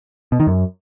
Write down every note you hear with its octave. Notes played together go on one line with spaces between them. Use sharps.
B2
D#3
F#2